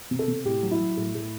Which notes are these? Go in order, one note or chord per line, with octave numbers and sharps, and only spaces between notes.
C3
A4
C3
A2 G4
F#3
E4
F#3
A2
A2